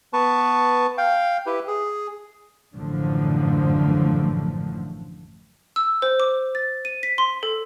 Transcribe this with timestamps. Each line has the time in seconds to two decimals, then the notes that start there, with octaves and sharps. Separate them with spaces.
0.13 B3 B4 A5 C#6
0.98 F5 G5
1.46 E4 G4 B4
1.68 G#4
2.73 A1 F#2 A2 D3 F3 A3
5.76 E6
6.02 C5
6.20 D6
6.55 A6
6.85 D#7
7.03 B6
7.18 C6
7.43 A4